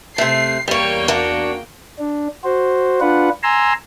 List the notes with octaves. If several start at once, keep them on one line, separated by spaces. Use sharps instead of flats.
C3 A3 C7
E2 G3 A#3 C#5 G5
D4 F#4
D4
F#4 C5
D4 F4 B4 F#5
G#5 A#5 C6 E6